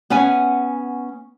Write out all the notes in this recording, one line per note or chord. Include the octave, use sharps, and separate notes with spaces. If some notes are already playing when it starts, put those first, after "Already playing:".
B3 C#4 F#5 G#5